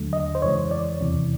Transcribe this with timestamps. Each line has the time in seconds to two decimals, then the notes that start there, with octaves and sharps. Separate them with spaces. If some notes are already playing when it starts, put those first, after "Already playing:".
Already playing: D#2 D3 F#3 A3
0.13 D#5
0.35 C5
0.42 F2 C#3 E3 G#3 C#5
0.71 D5
1.01 E2 C3 E3